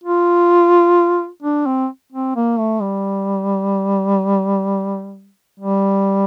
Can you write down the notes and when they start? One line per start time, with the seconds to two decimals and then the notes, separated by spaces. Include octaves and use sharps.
0.04 F4
1.43 D4
1.66 C4
2.13 C4
2.36 A#3
2.59 A3
2.82 G3
5.60 G3